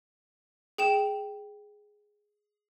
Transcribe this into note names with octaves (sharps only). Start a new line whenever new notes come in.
G#4 G5 E7